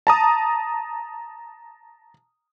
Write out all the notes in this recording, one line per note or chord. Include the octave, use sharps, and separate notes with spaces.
A5 A#5 D#6